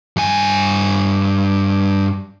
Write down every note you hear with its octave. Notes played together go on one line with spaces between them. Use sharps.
G2 G#5